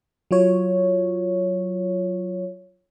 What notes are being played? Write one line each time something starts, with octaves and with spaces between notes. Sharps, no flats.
F#3 F4 C#5